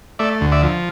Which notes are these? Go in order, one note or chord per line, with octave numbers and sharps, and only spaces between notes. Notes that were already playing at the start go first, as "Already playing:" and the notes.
A3 D5 E5
D2
D5 E5
F3